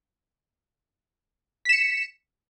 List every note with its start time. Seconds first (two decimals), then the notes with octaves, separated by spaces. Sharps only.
1.65 B6
1.69 E7
1.73 C#7